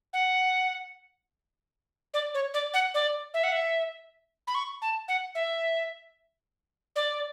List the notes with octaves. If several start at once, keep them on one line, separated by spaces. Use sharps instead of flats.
F#5
D5
C#5
D5
F#5
D5
E5
F#5
E5
B5
C#6
A5
F#5
E5
D5